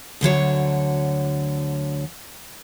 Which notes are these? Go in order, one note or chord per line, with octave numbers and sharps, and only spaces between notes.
D2 D3 F#3 C#5